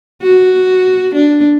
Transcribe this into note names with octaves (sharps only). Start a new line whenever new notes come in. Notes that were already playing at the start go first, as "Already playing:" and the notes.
F#4
D4